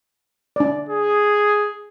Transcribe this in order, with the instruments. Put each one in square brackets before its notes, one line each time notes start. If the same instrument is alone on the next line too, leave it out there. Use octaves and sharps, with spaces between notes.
[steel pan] D4 D5
[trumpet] G#4